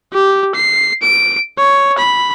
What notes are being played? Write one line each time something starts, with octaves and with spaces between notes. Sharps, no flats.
G4
C7
D7
C#5
B5